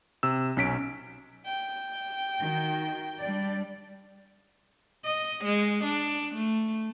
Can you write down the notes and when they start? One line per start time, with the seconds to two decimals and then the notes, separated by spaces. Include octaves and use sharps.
0.23 C3 E6
0.57 B1 C#4 B6 D7
1.45 G5
2.39 D#3 F#4
3.19 G3 D4 D5
5.04 D#5
5.44 G#3
5.84 D4
6.35 A3